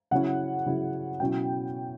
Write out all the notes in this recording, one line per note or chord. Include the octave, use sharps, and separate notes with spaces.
C#3 F#3 C#4 E4 F#5
C#3 F#3 C#4 E4
B2 F#3 C#4 E4 G5